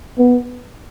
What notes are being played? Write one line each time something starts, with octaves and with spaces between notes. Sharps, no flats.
B3